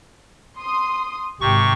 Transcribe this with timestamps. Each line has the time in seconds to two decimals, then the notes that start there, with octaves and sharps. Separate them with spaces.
0.57 C6 D#6
1.41 G#1 C3 G4 C#6